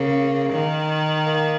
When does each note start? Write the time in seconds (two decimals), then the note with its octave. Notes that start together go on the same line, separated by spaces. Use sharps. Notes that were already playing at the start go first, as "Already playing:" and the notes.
Already playing: C#3 A#3
0.52 D#3
1.26 A#3